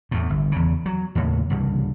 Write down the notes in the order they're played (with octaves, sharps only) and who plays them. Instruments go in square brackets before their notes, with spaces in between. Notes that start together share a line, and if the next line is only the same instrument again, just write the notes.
[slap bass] E2 A2
G1
E2 C#3
F#3
D#2 A2 C#3
C2 G2 C#3